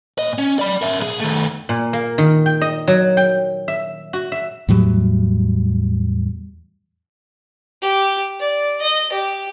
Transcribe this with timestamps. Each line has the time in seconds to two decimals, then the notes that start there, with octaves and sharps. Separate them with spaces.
0.19 A#2 D#5
0.38 C#4
0.59 D5 B5
0.82 A#4 E5
1.00 B1 G#4
1.20 D#3 A3
1.69 A#2
1.93 A#3
2.18 D#3
2.46 G5
2.61 D#5
2.88 F#3
3.17 G5
3.68 E5
4.13 F#4
4.32 E5
4.69 E2 A2 F#3 G3
7.82 G4
8.40 D5
8.82 D#5
9.12 G4